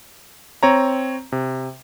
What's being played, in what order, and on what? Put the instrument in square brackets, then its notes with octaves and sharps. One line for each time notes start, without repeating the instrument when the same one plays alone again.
[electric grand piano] C4 C#5 A#5
C3